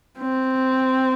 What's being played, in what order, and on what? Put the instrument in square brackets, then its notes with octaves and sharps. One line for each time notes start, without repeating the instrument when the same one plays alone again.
[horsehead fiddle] C4